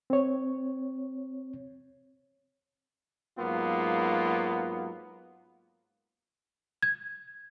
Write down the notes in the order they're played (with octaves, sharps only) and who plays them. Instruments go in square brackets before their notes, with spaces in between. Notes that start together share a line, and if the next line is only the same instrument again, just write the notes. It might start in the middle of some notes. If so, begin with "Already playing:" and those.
[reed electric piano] C4 C#5
[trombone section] G#2 F#3 A#3 B3 F4
[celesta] G#6